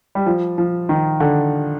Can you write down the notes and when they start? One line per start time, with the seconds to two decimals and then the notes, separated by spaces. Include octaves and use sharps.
0.15 G3
0.26 F3
0.58 F3
0.89 D#3
1.20 D3